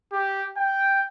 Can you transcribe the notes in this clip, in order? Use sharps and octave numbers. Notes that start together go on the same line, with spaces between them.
G4
G5